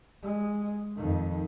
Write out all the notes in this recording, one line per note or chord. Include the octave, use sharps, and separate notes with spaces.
G#3
F2 D#3